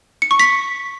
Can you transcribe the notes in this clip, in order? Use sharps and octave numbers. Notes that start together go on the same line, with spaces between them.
C#7
C#6
B6